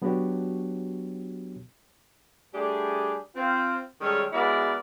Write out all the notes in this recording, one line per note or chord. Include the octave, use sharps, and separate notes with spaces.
F#3 B3 D4 F#4 G4 C#5
G3 A3 D4 G4 G#4
C4 F4
D#3 G3 G#3 C#4 A4 C#5
G#3 B3 E4 F#4 A#4 D5